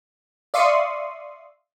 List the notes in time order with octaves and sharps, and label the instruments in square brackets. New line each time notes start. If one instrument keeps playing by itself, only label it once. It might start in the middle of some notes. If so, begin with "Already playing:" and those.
[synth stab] D5 E5 F5 C6 C#6 D#6